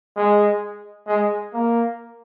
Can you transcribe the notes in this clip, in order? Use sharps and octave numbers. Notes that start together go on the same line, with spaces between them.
G#3
G#3
A#3